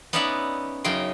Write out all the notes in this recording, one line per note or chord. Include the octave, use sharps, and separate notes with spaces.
B3 C#4 D#4 D5 E5 F#5
F#2 C#3 D#4 G5 C6